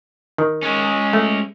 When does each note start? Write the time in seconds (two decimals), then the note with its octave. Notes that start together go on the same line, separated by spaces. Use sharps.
0.38 D#3
0.63 G#3 C#4
1.13 A3